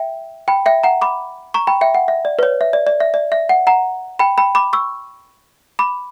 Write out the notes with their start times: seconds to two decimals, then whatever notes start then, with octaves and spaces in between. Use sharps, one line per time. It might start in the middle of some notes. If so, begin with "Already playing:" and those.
Already playing: E5 G5
0.48 G5 B5
0.66 E5 G5
0.83 F#5 A#5
1.02 B5 D6
1.54 A#5 C#6
1.67 G5 B5
1.81 E5 G5
1.95 F#5
2.08 E5
2.25 D5
2.39 B4
2.43 C#5
2.61 E5
2.73 D5
2.87 D5
3.00 E5
3.14 D5
3.32 E5
3.49 F#5
3.67 F#5 A#5
4.19 G5 B5
4.38 G5 B5
4.55 B5 D6
4.73 C#6 E6
5.79 B5 D6